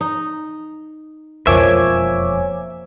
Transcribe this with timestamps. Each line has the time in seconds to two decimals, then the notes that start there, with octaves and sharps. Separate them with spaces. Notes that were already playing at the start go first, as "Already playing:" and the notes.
0.01 D#4
1.47 E1 F2 F3 A#3 C#5 E5 G#5 D6